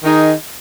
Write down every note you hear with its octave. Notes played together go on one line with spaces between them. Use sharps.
D#3 D#4 G#4